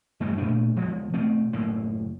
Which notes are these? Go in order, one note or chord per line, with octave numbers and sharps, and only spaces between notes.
F#2 A2 G3 G#3
A#2 A3 D4
E1 F3 G#3
B2 A3 C4
F#1 A2 A#3